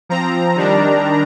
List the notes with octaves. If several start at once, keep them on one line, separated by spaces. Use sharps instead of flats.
F3 C4 A#5
D#3 G3 D4